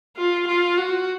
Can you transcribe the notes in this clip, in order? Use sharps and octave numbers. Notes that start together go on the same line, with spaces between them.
F4
F4
F#4